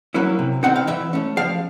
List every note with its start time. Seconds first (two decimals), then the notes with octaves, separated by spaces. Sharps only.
0.14 F#3 A#3 C#4 E4
0.39 C3
0.63 E3 A3 C4 D#4 F#5
0.76 F5
0.87 E3 E5
1.13 A3 C#4
1.37 F3 F5